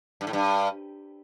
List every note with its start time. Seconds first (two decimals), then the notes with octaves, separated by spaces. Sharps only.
0.21 G2
0.27 A2
0.33 G2